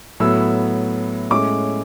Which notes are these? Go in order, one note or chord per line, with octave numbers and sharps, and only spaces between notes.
A2 F#3 B3 E6
A2 G#3 C#4 D6